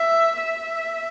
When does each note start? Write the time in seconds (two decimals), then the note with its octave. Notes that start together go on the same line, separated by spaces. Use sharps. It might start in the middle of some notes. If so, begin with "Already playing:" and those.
Already playing: E5
0.36 E5